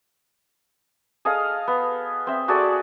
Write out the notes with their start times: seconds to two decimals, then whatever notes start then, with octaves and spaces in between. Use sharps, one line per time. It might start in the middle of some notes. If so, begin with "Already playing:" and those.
1.25 G#4 A4 D#5 F5
1.68 B3
2.27 C4 E5
2.48 F#4 G#4 A4 D5